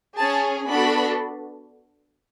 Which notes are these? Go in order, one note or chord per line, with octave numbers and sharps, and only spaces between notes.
C#4 G#4 A5
B3 D4 F#4 A4 B5